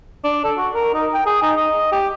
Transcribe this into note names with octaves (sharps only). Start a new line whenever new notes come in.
D4
A4
F#4
A#4
D#4
G5
G#4
D#4
D#5
G4